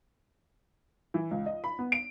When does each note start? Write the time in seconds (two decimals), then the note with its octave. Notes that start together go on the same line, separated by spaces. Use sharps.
1.14 E3
1.31 C#2
1.46 D#5
1.64 B5
1.79 B3
1.92 D7